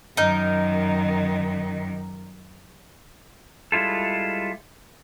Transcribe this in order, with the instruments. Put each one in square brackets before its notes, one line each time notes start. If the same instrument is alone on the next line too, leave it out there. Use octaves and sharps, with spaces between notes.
[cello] F#2 D#3 [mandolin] D#4 A#4
[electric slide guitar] G3 G#3 E4 F4 A4